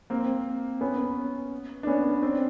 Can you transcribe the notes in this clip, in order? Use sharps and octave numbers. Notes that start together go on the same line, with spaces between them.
A#3 C4
B3 C#4
D4
B3 C#4
C4 D4